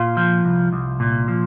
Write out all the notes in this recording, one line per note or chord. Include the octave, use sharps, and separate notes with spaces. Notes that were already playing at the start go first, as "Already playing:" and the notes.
Already playing: A#2 F4
F3
C2
C2
A#2
F3